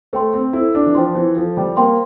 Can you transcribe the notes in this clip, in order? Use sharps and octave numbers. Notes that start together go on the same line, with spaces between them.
A3 C5 G5 C6
C4
E4 A4
D4
E3
F3 C5 G5 C6
E3
F3 A4
G3
A#3 C5 G5 C6